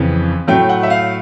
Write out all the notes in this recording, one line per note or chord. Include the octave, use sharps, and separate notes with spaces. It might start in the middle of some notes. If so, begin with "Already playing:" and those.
Already playing: F2 C#3 E3
A2 F#3 A3 G5
F#5
E5
F5